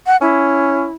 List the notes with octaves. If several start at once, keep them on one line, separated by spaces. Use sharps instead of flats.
F#5
C#4 E4